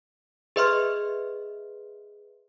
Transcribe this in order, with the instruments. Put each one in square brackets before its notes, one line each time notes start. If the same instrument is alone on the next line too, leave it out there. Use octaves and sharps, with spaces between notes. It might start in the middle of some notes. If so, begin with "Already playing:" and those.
[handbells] G#4 B4 D#5 E5 C6 F6